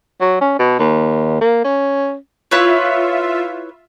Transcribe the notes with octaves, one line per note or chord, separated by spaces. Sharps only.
F#3
C#4
B2
D#2
A#3
C#4
E4 F4 B4 C#5 E5